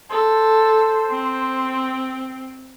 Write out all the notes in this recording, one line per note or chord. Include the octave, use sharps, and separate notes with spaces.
A4 C5
C4